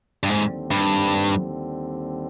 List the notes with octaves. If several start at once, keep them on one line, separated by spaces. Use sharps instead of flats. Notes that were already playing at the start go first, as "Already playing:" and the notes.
G2
D#2 G#2 D3 G3 C4
G2